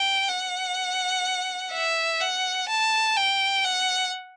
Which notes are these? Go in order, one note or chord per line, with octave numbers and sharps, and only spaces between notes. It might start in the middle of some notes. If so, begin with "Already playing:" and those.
Already playing: G5
F#5
E5
F#5
A5
G5
F#5